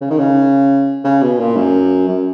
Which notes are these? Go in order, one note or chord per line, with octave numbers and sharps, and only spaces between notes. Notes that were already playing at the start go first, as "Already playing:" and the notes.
C#3
D#3
C#3
C#3
B2
A#2
F#2
F#2